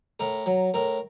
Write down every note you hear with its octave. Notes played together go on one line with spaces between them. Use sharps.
A2 A#4
F#3
A2 A#4